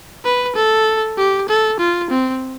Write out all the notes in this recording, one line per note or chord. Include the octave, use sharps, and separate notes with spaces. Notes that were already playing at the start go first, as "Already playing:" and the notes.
B4
A4
G4
A4
F4
C4